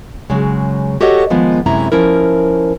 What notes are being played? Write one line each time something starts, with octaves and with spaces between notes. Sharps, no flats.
C#3 F#3 G#3
F#4 G4 A4 C#5 D#5 F#5
D#3 F3 G#3 B3
F#2 C3 G#3 C#4 E4 A#5
F3 C#4 E4 A#4